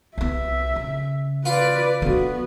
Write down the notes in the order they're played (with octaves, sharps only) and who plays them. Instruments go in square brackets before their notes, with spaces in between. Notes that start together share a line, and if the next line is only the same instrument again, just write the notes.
[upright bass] C2 B3 [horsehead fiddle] E5
[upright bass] C#3
[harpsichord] F4 [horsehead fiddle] B4 D5
[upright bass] D3 F#3 [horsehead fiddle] B3 F#4